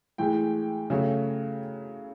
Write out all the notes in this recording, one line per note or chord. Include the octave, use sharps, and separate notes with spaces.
A2 E3 G#3 G5
C#3 F#3 A3